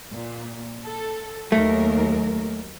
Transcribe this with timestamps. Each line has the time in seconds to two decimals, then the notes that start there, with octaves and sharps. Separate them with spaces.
0.11 A#2
0.85 A4
1.52 D#2 F#3 A3 A#4